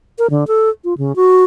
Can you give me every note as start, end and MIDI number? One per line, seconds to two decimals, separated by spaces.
0.19 0.27 70
0.30 0.44 50
0.48 0.70 69
0.84 0.94 65
0.98 1.15 49
1.16 1.44 66